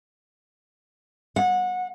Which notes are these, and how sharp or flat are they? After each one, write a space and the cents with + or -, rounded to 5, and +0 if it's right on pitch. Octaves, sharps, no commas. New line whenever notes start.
F#5 -25